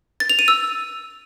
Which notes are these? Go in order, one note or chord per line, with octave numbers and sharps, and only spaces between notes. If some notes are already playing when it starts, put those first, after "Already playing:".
A6
F7
D#7
E6